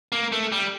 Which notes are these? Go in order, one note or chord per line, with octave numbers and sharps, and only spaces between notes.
A#3
A3
G3